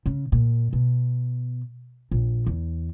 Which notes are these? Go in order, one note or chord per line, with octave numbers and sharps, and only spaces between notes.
C#3
A#2
B2
A#1
E2